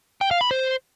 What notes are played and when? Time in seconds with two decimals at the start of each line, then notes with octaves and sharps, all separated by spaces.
0.21 G5
0.31 F5
0.41 B5
0.51 C5